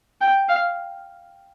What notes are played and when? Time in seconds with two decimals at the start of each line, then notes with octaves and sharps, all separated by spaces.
0.21 G5
0.49 F5